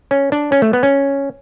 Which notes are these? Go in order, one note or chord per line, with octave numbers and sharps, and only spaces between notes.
C#4
D4
C#4
A3
B3
C#4